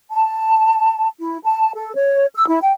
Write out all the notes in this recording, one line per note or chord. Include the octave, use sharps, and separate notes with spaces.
A5
E4
A5
A4
C#5
E6
E4
G5